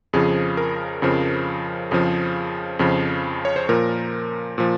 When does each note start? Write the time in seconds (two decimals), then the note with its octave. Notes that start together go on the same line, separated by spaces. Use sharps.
0.13 F2 C#3 F3 G#4
0.57 A#4
1.02 F2 C#3 F3
1.91 F2 C#3 F3 G#4
2.79 F2 C#3 F3
3.45 C#5
3.56 C5
3.69 A#2 F3 A#4
4.58 A#2 F3